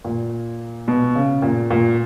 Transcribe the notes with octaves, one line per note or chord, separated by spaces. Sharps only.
A#2
B2
C#3
A#2
A#2